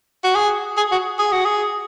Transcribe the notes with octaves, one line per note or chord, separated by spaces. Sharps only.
F#4
G#4
G#4
F#4
G#4
F#4
G#4